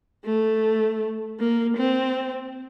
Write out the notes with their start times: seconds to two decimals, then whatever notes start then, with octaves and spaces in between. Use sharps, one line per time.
0.24 A3
1.40 A#3
1.77 C4